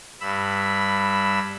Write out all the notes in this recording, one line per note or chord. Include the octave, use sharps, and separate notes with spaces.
G2 B5 E6